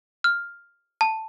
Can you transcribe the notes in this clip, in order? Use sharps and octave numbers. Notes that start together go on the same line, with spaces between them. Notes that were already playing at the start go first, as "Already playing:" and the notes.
F6
A5